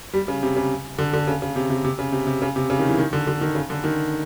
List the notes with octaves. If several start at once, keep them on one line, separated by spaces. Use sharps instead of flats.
G3
C#3
C3
C#3
D3
D3
C#3
C#3
C3
C3
C3
C#3
C3
C3
C#3
C3
C#3
D#3
E3
D#3
D3
D3
D#3
C#3
D3
D#3